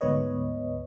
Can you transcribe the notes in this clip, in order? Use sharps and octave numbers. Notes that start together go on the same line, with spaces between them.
D2 G#2 B3 B4 C#5 D#5